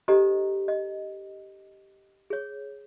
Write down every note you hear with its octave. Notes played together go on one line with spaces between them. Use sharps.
D4 G4 A4 C5 D#5 A#5
D#5
G#4 C#5